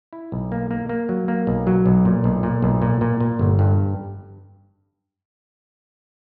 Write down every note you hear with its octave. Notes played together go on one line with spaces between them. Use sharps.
E4
B1
A#3
A#3
A#3
F#3
A#3
B1
F#3
B1
A#2
B1
A#2
B1
A#2
A#2
A#2
G1
G2